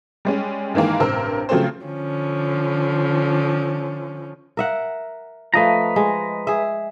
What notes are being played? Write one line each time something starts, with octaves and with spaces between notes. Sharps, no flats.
G3 G#3 C#4
G2 D#3 E3 G#3 A#3
A1 G2 C3 A#4 C5 E6
C#3 F3 F#3 A3 C4 C5
D3 F3 C#4
A#4 E5 F#5
F3 A3 B4 D#5 A#5
G#3
G#4 E5